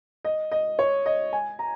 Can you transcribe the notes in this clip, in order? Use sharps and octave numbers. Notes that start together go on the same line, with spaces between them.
D#5
D#5
C#5
D#5
G#5
A#5